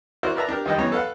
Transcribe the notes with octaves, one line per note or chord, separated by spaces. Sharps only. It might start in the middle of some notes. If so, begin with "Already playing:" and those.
E4 F#4 A#4 C5 D5
A#4 B4 D5 E5 A5 A#5
D4 G4 A#4
D#2 F3 G3 D#5 G5
F#2 B2 E3 C#5 A#5
A4 B4 F5 F#5